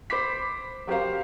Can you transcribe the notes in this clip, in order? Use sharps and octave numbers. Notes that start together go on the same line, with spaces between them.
C5 B5 D6 B6
F#3 G4 A#4 C5 F5